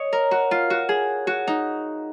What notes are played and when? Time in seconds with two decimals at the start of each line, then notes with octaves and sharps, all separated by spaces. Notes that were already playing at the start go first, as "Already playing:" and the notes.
Already playing: C#5 D#5
0.13 A#4
0.31 F#4
0.51 F4
0.70 F#4
0.89 G#4
1.27 F#4
1.47 D#4